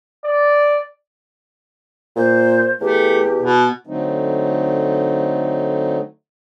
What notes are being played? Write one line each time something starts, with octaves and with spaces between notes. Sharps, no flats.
D5
A#2 C5
E2 A3 G4
B2
D3 F#3 A3 C4 D#4